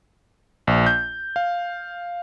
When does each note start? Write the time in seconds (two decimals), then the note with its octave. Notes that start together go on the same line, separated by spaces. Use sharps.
0.67 A#1
0.86 G6
1.36 F5